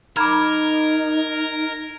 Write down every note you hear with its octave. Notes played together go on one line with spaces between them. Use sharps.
D#4 A#4 A#5 B5 D6 F6 G#6